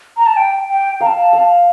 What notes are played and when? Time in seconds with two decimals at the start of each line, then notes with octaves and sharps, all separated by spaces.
0.17 A#5
0.26 A5
0.37 G5
0.69 G5
1.00 F5 A#5
1.06 A5
1.33 F5